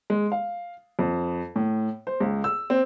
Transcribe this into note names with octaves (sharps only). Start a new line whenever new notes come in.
G#3
F5
F2
A2
C5
C#2
E6
C4